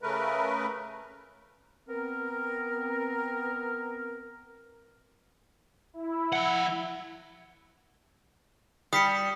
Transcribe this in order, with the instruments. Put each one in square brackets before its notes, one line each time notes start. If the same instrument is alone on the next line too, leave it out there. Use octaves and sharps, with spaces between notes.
[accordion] C#3 A3 A#4 B4
[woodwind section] B3 C4 A#4
[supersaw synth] E4
[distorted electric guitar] F3 F#5
[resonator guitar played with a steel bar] G3 [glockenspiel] D#6 B6 C#7